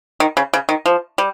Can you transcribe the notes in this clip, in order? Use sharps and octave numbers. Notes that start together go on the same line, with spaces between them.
D#3
C#3
C#3
D#3
F3
G3